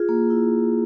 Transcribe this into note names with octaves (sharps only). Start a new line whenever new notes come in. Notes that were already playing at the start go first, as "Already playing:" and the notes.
Already playing: F4 G#4
A#3
E4